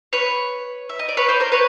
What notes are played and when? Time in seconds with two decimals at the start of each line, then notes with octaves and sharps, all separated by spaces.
0.13 B4 C#5
0.89 E5
0.99 D#5
1.09 D5
1.17 B4 C#5
1.28 C5 D5
1.40 A#4 C5
1.52 B4 C#5